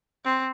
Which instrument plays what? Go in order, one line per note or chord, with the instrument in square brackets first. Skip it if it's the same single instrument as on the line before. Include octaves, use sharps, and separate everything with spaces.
[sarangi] C4